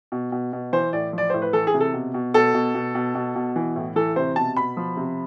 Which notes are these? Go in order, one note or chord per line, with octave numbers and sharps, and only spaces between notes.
B2
B2
B2
E3 C5
A2 D5
F3 D5
A2 C5
B4
E3 A4
G#4
C3
A4
B2
B2
B2 A4
B2
B2
B2
B2
B2
E3
A2
E3 A4
C3 C5
B2 A5
B2 B5
F3
C3